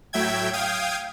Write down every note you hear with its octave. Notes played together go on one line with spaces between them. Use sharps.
A2 F#3 E5 G5 G#6
F5 G5 D#6 G#6